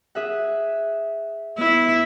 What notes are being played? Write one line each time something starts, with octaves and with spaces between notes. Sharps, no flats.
G#4 E5 F#5
B3 E4